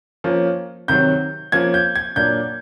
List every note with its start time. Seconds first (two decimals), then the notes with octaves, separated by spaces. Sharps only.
0.24 F3 A#3 C#4
0.88 C3 D#3 F#3 G6
1.52 F3 A#3 C#4 G#6
1.74 G6
1.95 G#6
2.16 A#2 F#3 A#3 D4 G6